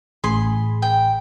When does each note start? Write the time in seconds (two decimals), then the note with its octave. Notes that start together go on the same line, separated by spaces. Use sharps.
0.24 A1 G#4 B5 C6
0.82 G5